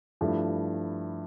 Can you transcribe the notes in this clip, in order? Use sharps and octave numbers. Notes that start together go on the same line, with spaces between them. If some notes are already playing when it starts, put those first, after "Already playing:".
G2 F3 A3 E4